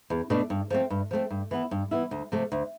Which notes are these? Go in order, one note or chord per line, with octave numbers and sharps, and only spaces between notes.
E2
B2 A3 D4
G2
F3 A3 C4
G2
F3 A3 C4
G2
E3 B3 E4
G2
E3 B3 E4
D2
C3 F3 A3
D2